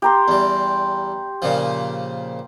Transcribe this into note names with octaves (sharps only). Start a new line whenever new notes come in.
G4 A#5 C6
E2 G3
A#2 C#3 F3